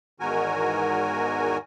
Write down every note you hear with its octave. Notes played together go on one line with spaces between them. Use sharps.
E2 G#2 D#3 F#4 A#4 G#5